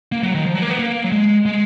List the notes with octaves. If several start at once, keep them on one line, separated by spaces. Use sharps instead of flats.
A#3
F#3
D#3
F3
F#3
A#3
B3
A#3
F#3
G#3
G#3